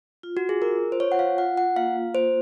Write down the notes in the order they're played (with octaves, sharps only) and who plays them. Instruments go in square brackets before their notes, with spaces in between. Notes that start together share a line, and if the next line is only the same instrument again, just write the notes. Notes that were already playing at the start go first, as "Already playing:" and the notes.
[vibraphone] F4
[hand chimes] F#4
G#4
[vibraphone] F4 [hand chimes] A#4
[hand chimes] C5
[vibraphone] F4 [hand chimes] C#5
[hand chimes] F#5
F5
[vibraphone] F4 [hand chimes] F#5
[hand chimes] F#5
[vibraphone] A#3 [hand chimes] F5
[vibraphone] A#3 [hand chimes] C5